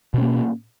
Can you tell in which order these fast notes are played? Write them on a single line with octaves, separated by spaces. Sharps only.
B2 C#4 A#3